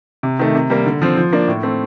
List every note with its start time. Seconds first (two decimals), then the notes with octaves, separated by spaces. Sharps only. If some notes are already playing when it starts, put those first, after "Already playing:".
0.23 C3
0.39 D#3 A3
0.55 C3
0.70 G3 A#3
0.86 D3
1.02 F3 C4
1.17 F3
1.33 A#3 D4
1.48 A2
1.63 A3 C4